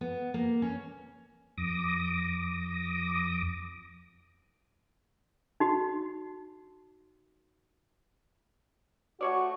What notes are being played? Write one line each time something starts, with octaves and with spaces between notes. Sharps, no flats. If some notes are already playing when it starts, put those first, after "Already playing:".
B3
A#3
C#4
F2 D6 D#6 A#6
D#4 F#4
A3 F#4 C#5 D5